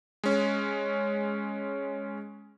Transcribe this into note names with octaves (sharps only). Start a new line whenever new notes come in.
G#3 C#4